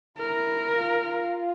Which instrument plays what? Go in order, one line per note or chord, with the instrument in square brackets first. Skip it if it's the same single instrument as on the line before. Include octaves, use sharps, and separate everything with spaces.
[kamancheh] E4 [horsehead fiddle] A#4
[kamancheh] F4
F4